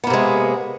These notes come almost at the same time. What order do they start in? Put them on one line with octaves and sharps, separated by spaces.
B3 A#3 C3 G#3